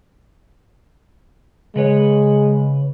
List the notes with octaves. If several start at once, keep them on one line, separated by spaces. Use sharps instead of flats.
C#3 G#3 B4 C#5